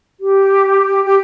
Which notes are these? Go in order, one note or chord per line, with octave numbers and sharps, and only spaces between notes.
G4
G4